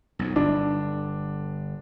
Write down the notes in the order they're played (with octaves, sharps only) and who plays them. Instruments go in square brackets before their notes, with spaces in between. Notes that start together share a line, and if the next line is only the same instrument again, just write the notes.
[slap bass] B1 F2
[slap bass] G1 [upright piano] D4